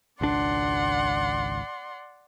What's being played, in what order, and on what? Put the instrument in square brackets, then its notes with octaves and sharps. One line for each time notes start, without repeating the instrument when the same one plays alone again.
[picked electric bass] G#1 C#2 D4 [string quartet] D5 F#5 C6